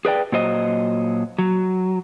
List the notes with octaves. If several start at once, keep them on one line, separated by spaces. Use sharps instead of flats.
G#4 B4 D5 G5
A#2 F#3 C5 D#5
F#3